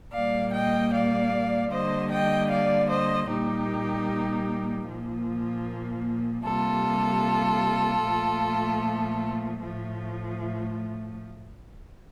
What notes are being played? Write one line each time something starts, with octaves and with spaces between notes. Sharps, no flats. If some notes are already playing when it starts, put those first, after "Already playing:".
A#2 G3 A#3 D5 F5
D#5 G5
D5 F5
D3 G3 A#3 C5 D#5
D#5 G5
D5 F5
C5 D#5
A#2 G3 A#3 D#4 G4
A#2 F3 A#3
C3 G3 A#3 F4 A4
A#2 F3 A3
A2 F3 A3